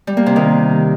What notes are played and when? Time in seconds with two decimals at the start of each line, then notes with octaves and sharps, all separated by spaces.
0.07 G3
0.17 A#3
0.26 C3
0.36 D#3